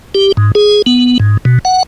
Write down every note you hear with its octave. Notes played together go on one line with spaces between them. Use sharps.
G4
G#2
G#4
B3
G#2
B2
F#5